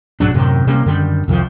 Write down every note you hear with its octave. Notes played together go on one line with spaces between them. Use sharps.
B1 G#2 F#3 D4
F#2 A2 C3 D#3
C3 G3 A#3 C#4
F#2 D3 D#3 G3
C2 F2 D#3 F3